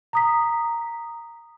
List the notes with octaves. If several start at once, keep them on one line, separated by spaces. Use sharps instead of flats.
A#5 D#6 B6